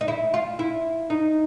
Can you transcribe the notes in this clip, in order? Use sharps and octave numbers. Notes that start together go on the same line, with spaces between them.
D#4
E4
F4
E4
D#4